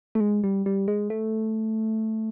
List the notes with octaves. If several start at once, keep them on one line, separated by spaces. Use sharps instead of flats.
A3
G#3
G3
G3
G#3
A3